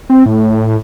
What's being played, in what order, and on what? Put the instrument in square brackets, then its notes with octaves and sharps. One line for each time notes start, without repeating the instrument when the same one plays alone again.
[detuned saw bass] C4
A2